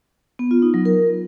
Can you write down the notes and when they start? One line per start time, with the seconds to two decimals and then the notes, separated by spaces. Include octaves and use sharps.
0.39 B3
0.51 F4
0.62 D#4
0.74 F#3
0.85 A#4